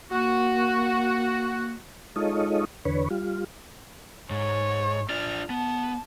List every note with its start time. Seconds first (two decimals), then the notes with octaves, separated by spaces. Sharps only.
0.11 A#3 F#4
2.16 G#3 D#4 F4 A4 C#5 D#5
2.85 E2 D3 B4 C#5
3.10 G3 F4
4.31 G#2 C#5
5.10 D4 F4 D5 F6
5.50 B3 A5